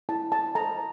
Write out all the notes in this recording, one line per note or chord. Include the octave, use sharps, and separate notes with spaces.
E4 A5
A5
A4 C5 A#5